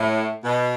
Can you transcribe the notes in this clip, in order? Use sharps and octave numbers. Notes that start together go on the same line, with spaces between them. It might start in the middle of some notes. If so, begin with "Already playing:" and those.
Already playing: A2
B2